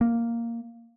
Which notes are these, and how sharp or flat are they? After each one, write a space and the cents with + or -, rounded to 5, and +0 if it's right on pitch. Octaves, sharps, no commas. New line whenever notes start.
A#3 -5